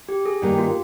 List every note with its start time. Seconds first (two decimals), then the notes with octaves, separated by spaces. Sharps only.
0.09 G4
0.26 G#4
0.42 G2 D#3 A#3 G4
0.58 F4